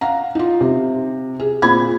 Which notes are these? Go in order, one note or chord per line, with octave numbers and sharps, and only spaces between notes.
F5 F#5 A#5
D#4 F4
C3
G#4
A#2 C4 B5 G#6